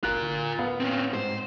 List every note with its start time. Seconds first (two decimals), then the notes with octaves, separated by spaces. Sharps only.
0.03 G1 F4 A#4 F#6
0.22 D3
0.59 A2 B3 F5
0.80 C4 C#4
1.14 G#2 C5